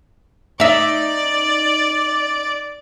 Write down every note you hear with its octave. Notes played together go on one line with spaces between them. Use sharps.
D#4 D5 E5